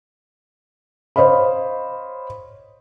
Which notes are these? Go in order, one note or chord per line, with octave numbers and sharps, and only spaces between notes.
C5 C#5 D#5 F5 B5